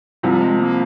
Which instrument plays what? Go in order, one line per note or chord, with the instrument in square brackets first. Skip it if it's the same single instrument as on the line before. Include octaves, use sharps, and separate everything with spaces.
[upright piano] C2 C3 F3 C4 [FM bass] G3
[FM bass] G#3
A#3